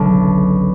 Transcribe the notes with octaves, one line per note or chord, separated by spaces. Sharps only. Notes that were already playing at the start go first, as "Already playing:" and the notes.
Already playing: F#1 B1 F#2 B2 D3 F#3 A3